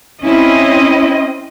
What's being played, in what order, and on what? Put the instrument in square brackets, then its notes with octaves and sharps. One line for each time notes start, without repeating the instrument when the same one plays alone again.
[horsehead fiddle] C4 D#5 [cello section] C#4 E4